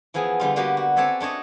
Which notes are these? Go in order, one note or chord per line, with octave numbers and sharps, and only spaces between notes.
E3 F3 B3 G#4
D3 G3 F4
G3 A#3 B3 F#4 G4
F#4
C4 A4 C#5 D5 E5 G#5
A3 D4 C#5 D#5